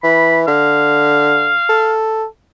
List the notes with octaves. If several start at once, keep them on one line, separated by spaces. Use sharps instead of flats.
E3 B5
D3 F5
A4